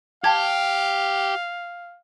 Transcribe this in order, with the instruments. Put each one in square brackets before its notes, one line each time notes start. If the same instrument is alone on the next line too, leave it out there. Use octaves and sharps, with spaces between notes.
[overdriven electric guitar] G4 [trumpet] F5 [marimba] G5 A5 G#6